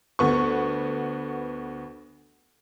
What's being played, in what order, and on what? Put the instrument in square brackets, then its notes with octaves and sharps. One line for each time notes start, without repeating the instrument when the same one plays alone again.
[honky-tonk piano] D2 B3 C#6